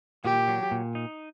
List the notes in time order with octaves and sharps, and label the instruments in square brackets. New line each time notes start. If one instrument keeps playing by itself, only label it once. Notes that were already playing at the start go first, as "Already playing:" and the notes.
[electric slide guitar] A#2 [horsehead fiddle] G4
[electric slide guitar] F#3
A#2
D#4